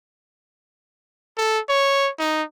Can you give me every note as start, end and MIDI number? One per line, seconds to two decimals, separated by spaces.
1.38 1.59 69
1.69 2.10 73
2.19 2.43 63